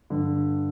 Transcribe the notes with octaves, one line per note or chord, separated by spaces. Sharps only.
G2 D3